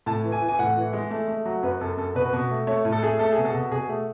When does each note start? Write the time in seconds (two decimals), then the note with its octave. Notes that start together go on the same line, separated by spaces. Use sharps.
0.06 A2 A5
0.24 E3
0.32 G#5
0.42 E3
0.48 G#5
0.59 A2 F#5
0.77 E3
0.93 G#3
1.10 A3
1.28 A3
1.45 F#3
1.63 F#2 B4
1.81 F#2 A4
1.97 F#2 A4
2.15 B2 B4
2.33 B2
2.50 A3
2.67 A3 C#5
2.85 A2
2.92 A4
3.03 A3 G#4
3.19 A3 A4
3.32 G#4
3.38 B2
3.45 A4
3.54 B2
3.72 B2 G#4
3.89 A3